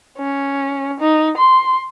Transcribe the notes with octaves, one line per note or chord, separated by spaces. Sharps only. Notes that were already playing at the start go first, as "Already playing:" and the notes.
C#4
D#4
C6